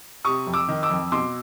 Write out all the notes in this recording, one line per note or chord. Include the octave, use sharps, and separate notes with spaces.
C3 C#6 D#6
F2
D6 E6
D#3
D6 E6
F2
B2 C6 D6